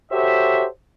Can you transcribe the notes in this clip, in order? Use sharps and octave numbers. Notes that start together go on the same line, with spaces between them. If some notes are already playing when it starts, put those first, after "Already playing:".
F#4 G4 A4 C5 C#5 E5